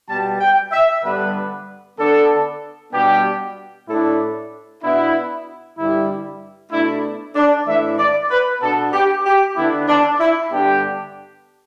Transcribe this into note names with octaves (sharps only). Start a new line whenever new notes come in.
B2 G3 B3 A5
G5
E5
G2 D3 G3 B3 D4 B4
D3 B3 D4 A4
B2 G3 B3 D4 G4
A2 A3 D4 E4
B2 B3 D4 E4
G2 D3 G3 E4
B2 A3 D4 E4
D4
A2 E3 A3 D4 E5
D5
B4
B2 B3 D4 A4
G4
G4
D3 B3 D4 E4
D4
E4
G2 D3 B3 D4 G4